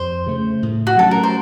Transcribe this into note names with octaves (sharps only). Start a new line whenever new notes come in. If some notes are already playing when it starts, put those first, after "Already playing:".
Already playing: F2 C5
C#3 A3
A2
F#4
F#3 A3 C#4 A4
A#4
C5